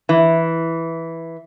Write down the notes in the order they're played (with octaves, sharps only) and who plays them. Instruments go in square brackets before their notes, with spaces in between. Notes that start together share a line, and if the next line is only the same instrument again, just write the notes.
[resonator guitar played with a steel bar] E3